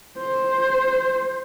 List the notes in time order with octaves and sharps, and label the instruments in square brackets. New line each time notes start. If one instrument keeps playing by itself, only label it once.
[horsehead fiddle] C5